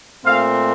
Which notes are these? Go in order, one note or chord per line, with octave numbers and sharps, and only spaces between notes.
A#2 A3 C4 F5